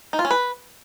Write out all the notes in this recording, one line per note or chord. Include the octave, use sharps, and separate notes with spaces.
D#4
F4
C#4
B4